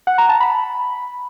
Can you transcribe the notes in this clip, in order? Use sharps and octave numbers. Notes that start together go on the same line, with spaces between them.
F#5
A#5
A5
B5